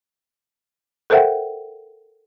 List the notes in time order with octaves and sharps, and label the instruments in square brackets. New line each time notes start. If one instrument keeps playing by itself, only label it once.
[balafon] A4 A#4 C5 E5 F#5 G5